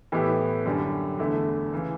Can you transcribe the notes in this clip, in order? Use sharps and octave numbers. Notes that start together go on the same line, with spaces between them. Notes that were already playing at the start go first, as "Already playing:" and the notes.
A2 E3 B3 E4 G4
F#2 D3 G3
E2 D3 A3 E4
C#3 E3